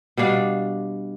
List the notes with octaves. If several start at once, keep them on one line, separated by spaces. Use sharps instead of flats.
B2 G3 D4 F5